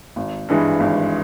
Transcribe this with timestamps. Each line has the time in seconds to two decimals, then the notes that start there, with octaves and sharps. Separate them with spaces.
0.16 G#1
0.49 G2 E3 G#3
0.80 G#1